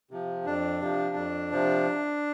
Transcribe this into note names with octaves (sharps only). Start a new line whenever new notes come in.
C3 F3
F2 D4
C3 F3
F2
C3 F3